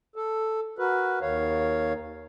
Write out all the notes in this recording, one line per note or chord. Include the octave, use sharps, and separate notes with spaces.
A4
F#4 A#4 B4
D#2 D#3 C#5 F5